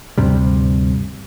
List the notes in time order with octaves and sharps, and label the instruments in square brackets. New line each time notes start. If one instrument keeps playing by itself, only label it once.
[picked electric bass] D2 G2 C3 G3